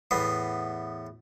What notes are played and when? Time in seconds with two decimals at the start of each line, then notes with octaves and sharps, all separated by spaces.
0.11 E2 A2 B3